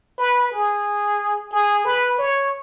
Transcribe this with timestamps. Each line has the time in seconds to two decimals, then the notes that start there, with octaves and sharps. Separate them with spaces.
0.18 B4
0.52 G#4
1.52 G#4
1.85 B4
2.18 C#5